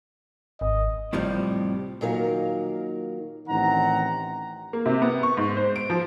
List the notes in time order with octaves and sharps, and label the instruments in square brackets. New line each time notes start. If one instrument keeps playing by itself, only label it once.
[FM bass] G#1 [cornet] D#5
[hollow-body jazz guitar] F2 A2 C3 F3 G3
[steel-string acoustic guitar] A#2 D#3 F#3 D#4 A#4 F5
[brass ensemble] A1 D#3 C4 F#5 A#5
[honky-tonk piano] A#3
C3
B3
C#6
G#2
C5
D7
F3